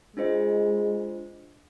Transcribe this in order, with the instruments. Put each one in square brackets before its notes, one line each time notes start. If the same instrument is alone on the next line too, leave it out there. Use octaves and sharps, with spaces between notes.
[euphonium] G#3 [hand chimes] D4 F4 C5 D#5